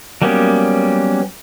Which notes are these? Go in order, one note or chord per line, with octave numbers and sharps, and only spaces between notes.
F#3 G3 A#3 B3 C#4